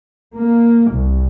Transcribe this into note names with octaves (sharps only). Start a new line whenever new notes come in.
A#3
C2